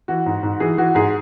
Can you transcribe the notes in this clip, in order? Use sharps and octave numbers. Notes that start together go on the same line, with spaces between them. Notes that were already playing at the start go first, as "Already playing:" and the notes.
E3 F#4
G#2
G#2
E3 G#4
E3 F#4
G#2 G#4